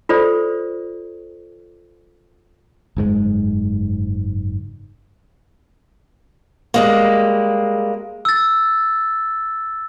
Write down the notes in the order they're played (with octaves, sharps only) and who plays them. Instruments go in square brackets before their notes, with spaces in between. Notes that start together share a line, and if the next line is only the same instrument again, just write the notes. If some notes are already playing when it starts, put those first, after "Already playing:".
[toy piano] F4 A4 C5 D5
[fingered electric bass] F#1 G#2 G#3
[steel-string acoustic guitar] G3 G#3 A#3
[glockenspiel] E6 A6